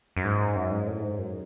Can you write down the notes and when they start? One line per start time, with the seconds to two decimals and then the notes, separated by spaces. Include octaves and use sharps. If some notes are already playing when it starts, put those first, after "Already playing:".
0.17 F#2
0.25 G#2
0.56 F#2
0.72 G#2
0.87 A2
1.03 G#2
1.19 F#2